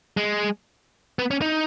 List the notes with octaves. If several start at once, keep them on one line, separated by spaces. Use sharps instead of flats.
G#3
B3
C#4
D#4